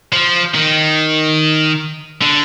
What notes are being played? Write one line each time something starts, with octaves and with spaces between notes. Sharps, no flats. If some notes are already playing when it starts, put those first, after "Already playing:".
F3
D#3
D3